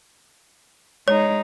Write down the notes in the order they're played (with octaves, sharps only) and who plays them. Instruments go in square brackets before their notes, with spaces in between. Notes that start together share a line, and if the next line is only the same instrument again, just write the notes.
[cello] G#3 D#4 [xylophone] C#5